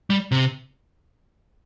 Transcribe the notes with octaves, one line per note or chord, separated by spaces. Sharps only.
G3
C3